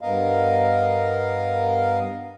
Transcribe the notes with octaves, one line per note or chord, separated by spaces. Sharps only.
G2 B3 A#4 D#5 F5